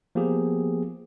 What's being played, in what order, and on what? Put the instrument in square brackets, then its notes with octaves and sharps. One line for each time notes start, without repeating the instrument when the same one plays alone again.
[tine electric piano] F3 A#3 B3 G4 G#4